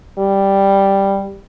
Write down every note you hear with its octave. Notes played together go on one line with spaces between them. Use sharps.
G3